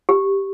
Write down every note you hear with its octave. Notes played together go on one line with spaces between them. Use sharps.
G4